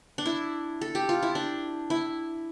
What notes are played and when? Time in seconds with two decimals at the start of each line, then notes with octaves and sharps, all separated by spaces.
0.18 D4
0.26 E4
0.81 A4
0.95 G4
1.09 F4
1.23 E4
1.35 D4
1.90 E4